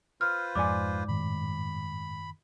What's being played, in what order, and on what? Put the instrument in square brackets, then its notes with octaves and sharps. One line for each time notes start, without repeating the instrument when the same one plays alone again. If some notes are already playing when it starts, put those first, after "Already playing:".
[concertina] F4 B4 C5 [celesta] F6
[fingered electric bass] F2 [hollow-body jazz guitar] G#2 D5 G#5 [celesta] D6
[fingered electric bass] F#2 A2 D#3 [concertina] B5